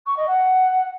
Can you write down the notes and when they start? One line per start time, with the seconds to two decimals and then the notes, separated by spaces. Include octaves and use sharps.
0.06 C#6
0.16 D#5
0.27 F#5